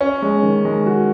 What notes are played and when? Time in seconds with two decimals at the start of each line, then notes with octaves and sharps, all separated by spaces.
0.01 C#4
0.22 G#3
0.43 D#3
0.65 G#3
0.86 F#4